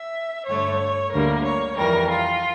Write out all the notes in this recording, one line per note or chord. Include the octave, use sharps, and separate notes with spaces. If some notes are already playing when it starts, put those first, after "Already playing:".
Already playing: E5
G2 D3 A3 C#5
D2 D3 G3 A#3 A#4
C#5
F2 E3 G3 A#4
F4